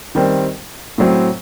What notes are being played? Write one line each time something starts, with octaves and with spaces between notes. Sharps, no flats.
D#3 G3 C4
A2 F#3 C4